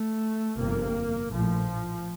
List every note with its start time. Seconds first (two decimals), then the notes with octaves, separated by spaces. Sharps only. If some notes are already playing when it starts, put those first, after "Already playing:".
Already playing: A3
0.57 G1 F2 C3 A#3
1.31 A#1 A2 F3